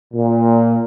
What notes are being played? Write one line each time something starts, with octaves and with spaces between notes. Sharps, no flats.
A#2